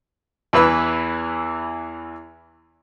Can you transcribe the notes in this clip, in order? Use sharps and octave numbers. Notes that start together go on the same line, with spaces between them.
E2 E3 B4 E6